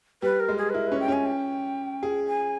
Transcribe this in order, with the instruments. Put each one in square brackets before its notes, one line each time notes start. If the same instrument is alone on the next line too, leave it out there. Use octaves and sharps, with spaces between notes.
[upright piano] G3 [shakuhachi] B4
[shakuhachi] A#4
[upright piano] G#3
[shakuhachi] G#4
B4
[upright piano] E4 [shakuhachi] A#4
[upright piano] C#4 [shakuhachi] B4
[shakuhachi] G5
[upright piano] C#4 [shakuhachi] G#5
[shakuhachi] G5
[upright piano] G#4
[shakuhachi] G#5